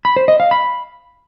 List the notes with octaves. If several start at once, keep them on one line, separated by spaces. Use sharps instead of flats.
B5
C5
D#5
F5
B5